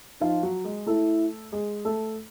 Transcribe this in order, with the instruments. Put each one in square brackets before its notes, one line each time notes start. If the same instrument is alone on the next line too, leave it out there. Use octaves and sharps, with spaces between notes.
[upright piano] F3 F4 [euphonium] D#4
[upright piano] F#3 F#4
G#3 G#4
[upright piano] A3 A4 [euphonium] E4
[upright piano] G#3 G#4
A3 A4